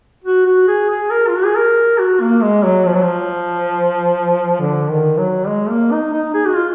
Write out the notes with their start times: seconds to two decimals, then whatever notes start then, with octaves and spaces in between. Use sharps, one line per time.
0.24 F#4
0.46 F#4
0.68 G#4
0.90 G#4
1.11 A#4
1.28 F4
1.36 F#4
1.45 G#4
1.56 A#4
1.99 F#4
2.21 A#3
2.43 G#3
2.64 F#3
2.86 F3
2.94 F#3
3.02 F3
4.61 D3
4.89 D#3
5.18 F#3
5.48 G#3
5.69 A#3
5.92 D#4
6.13 D#4
6.34 G#4
6.46 F#4
6.56 F4